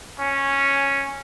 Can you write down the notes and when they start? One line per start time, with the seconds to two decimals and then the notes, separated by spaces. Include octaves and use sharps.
0.19 C#4